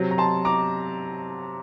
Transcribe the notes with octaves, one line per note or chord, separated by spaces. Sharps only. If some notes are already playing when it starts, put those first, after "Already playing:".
Already playing: C3 F#3
A#5
A5 C6
A#5 D6